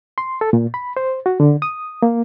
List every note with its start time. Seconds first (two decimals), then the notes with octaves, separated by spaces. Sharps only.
0.18 C6
0.41 A4
0.53 A#2
0.74 B5
0.97 C5
1.26 F#4
1.40 D3
1.62 D#6
2.02 A#3